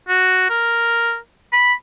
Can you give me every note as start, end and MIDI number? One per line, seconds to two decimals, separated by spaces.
0.08 0.46 66
0.50 1.17 70
1.53 1.73 83